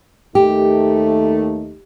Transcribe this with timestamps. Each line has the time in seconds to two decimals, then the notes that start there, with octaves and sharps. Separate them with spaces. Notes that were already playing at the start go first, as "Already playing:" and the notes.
0.35 D#2 A3 D#4 G4